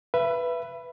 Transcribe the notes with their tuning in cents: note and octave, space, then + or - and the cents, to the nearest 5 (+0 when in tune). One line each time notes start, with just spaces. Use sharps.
B4 +0 E5 +30